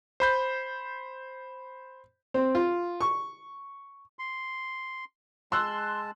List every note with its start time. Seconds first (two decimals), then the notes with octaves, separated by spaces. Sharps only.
0.20 C5 B5 G6
2.34 C4
2.55 F4
3.01 C#6
4.19 C6
5.52 G#3 A5 C6 E6 F#6